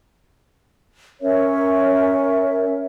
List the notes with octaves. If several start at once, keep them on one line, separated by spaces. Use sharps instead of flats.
C#4 A#4 C#5 E5